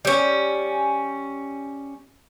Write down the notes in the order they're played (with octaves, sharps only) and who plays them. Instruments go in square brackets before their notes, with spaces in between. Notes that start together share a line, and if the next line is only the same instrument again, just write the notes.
[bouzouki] G3 C#4